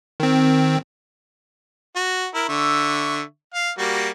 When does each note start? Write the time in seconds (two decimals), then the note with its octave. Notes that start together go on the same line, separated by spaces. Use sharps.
0.20 D#3 C4
1.96 F#4
2.35 E4 A#4
2.49 D3 E5 C#6
3.54 F5
3.78 G3 A#3 F#4